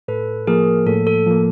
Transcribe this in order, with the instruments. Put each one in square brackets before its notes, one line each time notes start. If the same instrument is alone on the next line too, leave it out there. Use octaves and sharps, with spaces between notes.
[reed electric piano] A2 [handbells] A4 B4
[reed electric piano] F3 A#3 [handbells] G#4 A#4
[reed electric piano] A2 [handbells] A4
[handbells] A4
[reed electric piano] F3 A#3